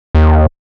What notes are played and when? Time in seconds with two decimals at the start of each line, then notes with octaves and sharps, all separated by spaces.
0.15 D#2